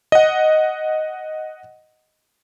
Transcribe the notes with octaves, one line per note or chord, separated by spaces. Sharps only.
D#5 F#5